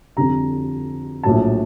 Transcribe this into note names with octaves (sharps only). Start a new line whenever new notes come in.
F2 D3 G3 A#5
A#1 A2 F#3 A5